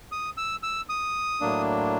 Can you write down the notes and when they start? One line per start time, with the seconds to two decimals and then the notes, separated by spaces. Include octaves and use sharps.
0.12 D#6
0.37 E6
0.63 E6
0.89 D#6
1.41 A2 F#3 A#3 D4